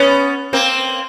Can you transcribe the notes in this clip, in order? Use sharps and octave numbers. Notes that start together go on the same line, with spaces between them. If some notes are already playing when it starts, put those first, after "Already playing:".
Already playing: B3 C#4
A#3 C4